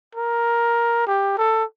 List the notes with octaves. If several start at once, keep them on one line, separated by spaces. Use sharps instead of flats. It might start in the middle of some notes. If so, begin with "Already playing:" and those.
A#4
G4
A4